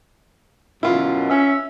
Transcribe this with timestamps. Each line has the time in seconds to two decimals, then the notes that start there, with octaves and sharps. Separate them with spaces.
0.83 F#2 B2 E4 F4
1.30 C#4 E5